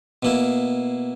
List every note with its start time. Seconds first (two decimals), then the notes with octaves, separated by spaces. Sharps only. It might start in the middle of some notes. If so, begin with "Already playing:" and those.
0.23 B2 A#3 E4